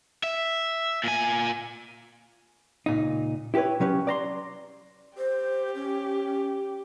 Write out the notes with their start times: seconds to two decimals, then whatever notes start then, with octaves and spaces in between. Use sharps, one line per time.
0.24 E5
1.04 A#2 G#5
2.86 C#2 A#2 D#4
3.54 E4 G4 A4 B4 C#5
3.80 C3 F#3 C#4 G4 B4
4.07 D5 A#5 C6
5.18 G4 C5
5.75 C#4